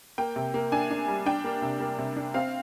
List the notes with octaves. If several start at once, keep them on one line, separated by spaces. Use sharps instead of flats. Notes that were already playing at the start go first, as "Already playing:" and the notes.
A#3 G5
C3
A#3
D4 G#5
D4
G3
D4 G5
A#3
C3
A#3
C3
D4
C4 F5